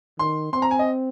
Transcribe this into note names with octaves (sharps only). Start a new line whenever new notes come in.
D#3 C6
C4 C6
A#5
G#5
D#5